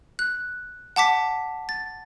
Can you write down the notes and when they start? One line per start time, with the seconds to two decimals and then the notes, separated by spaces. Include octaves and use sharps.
0.19 F#6
0.96 F#5 A5 D6 B6
1.69 A6